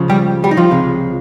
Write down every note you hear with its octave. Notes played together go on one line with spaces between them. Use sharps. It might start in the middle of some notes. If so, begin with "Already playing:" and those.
Already playing: C#2 C#3 F3
G3 G4
G3 G4
D#4
F3 F4
C#2 C3 F3 G#3